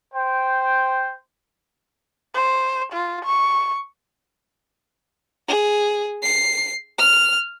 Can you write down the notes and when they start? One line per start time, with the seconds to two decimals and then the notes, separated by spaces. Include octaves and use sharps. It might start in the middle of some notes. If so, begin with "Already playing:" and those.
0.14 C5 G5
2.34 C5
2.93 F4
3.25 C#6
5.48 G#4
6.23 C7
6.98 F6